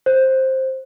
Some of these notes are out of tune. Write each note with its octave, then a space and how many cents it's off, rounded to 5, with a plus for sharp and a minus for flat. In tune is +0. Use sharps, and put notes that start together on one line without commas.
C5 +10